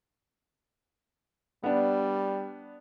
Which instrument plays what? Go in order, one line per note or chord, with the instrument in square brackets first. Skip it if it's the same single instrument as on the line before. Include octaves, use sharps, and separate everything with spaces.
[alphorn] G3 [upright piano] B3 D4